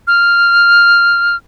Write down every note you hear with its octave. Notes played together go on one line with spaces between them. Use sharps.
F6